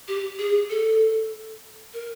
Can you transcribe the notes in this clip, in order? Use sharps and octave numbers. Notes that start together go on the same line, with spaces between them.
G4
G#4
A4
A#4